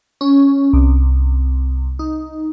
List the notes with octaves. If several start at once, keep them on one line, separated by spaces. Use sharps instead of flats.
C#4
C2
D#4